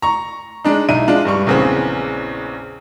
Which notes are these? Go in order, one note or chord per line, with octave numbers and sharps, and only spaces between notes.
A#5 C#6
G#3 D4 D#4
B1 D#4 E4 D#7
G#3 D4 F4
G2 G3 C#6
A#1 E2 C#3 E3 C4